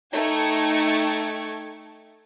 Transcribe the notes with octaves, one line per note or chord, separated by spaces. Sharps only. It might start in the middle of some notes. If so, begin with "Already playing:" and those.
A3 D#4 G5 C#6 G#6